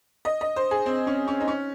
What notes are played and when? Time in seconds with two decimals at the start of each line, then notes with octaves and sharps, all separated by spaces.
0.25 D#5
0.41 D#5
0.56 C5
0.71 G#4
0.86 C4
1.07 C#4
1.28 C#4
1.41 D#4
1.48 C#4